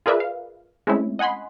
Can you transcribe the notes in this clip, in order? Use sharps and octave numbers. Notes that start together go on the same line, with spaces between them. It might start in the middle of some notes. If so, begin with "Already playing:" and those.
F4 G#4 A#4 B4 D5 E5
F5
G#3 A3 C4 C#4 E4
D#5 F#5 G#5 B5 C6